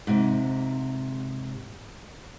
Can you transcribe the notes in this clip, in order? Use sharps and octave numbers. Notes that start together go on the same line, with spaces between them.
G#2 C3